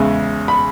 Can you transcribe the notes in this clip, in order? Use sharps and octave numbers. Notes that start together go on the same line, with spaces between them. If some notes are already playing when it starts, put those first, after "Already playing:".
Already playing: E2 C#3 G#3 G#5
B5